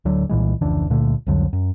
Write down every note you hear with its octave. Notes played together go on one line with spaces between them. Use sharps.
D1 D2 D3 F#3
C2 A#2 E3 G#3
F1 C#2 E3 D4
C#2 A#2 D3 A3
C2 F2 D3 F#3
F#2